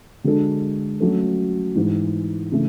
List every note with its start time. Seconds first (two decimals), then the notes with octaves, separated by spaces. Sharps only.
0.24 D3 G#3 D4 F#4 A4
1.00 F#3 A3 C#4 F#4 A4
1.75 G#2 E3 G#3
2.52 C#3 E3 A3